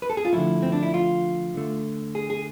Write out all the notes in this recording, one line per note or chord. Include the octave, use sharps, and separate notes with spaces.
B4
A4
G#4
F4
D3 F3 A3 E4
C4
D4
E4
F4
D3 A3
G#4
G#4